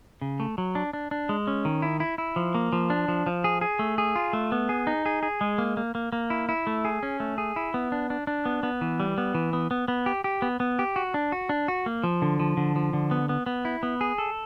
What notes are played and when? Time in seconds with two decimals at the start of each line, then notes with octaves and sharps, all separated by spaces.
0.22 C#3
0.40 A3
0.58 F#3
0.75 D4
0.93 D4
1.11 D4
1.29 G#3
1.47 C#4
1.65 D#3
1.82 E4
2.00 E4
2.18 E4
2.36 F3
2.55 A#3
2.73 F3
2.90 D4
3.08 F3
3.26 F3
3.44 G#4
3.61 G#4
3.79 A3
3.98 G#4
4.16 F4
4.33 A3
4.52 B3
4.69 G#4
4.87 D#4
5.06 G#4
5.23 G#4
5.41 G#3
5.58 A#3
5.77 A#3
5.95 A#3
6.13 A#3
6.30 E4
6.49 E4
6.67 A3
6.85 G#4
7.03 C#4
7.20 A3
7.38 G#4
7.56 E4
7.74 B3
7.92 D4
8.10 D4
8.27 D4
8.45 B3
8.63 B3
8.81 E3
9.00 G3
9.18 B3
9.34 E3
9.53 B3
9.71 B3
9.88 B3
10.06 G4
10.24 G4
10.42 B3
10.60 B3
10.79 G4
10.96 F#4
11.14 D4
11.32 F#4
11.49 D4
11.68 F#4
11.86 A#3
12.04 F3
12.22 D3
12.39 F3
12.57 D3
12.76 F3
12.93 D3
13.11 B3
13.29 B3
13.46 B3
13.65 E4
13.83 B3
14.01 G#4
14.18 A4